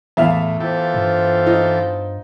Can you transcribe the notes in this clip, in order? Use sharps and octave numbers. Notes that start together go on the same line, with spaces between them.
E2 A2 E5 F5
E3 B3 F4 G4 A4 C5
G2
D#4